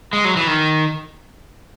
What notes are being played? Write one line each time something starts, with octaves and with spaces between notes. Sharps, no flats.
G#3
F#3
E3
D#3